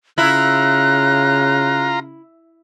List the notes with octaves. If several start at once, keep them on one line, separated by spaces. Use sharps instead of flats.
C#3 E4 F4 A#5 F#6